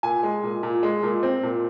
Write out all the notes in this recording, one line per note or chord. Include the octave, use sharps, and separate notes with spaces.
A#2 G#5
G#3
A#2
A#2
G#3
A#2
C4
A#2